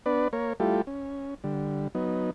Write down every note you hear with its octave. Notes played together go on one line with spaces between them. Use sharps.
B3 D4 B4 D5
A#3 A#4 C#5
G3 A3 E4 F4 G4 A4
C#4
D3 G3
F#3 B3 D#4